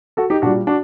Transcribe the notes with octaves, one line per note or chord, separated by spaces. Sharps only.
F#4 A4
D#4 G4
A#2 G3 D4 F#4
D4 F#4